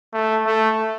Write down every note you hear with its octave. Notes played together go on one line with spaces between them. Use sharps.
A3
A3